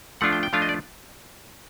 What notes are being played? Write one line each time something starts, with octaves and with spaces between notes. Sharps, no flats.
F3 A3 D4 F4 F#5
G5
G5
F3 A3 D4 F4 F5
D#5
D5